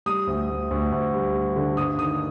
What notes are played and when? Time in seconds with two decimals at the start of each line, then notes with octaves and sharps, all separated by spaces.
0.06 G3 D#6
0.27 D2
0.49 D2
0.71 D2
0.92 D2
1.14 G3
1.35 G3
1.56 D3
1.77 G2 D#6
1.99 D#3 D#6